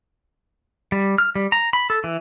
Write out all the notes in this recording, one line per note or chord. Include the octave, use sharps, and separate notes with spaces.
G3
F6
G3
A#5
B5
A4
E3